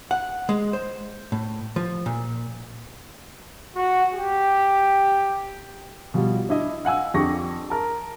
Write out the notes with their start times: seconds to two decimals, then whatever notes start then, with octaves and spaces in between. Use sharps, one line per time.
0.11 F#5
0.49 G#3
0.73 C5
1.32 A2
1.76 F3
2.06 A#2
3.76 F#4
4.14 G4
6.14 B2 F3 G3
6.49 D4 E4 D#5
6.85 F5 F#5 G#5 E6
7.14 F2 D4 G4 C#6 A#6
7.70 A#4 A5